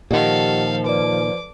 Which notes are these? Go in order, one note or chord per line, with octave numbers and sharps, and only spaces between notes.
A#2 D#3 F3 G4 A4 D#5 F5 F#5
B4 D5 D6